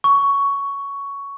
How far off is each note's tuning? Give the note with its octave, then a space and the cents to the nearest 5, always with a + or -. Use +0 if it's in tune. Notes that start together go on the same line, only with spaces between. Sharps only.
C#6 +10